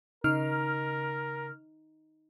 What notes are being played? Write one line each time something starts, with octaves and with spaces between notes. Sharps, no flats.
C#3 D#4 A#4 F6